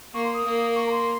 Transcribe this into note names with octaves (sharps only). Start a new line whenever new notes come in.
A#3 C#6
C6
D#6
A#3
C#6
A#5
C6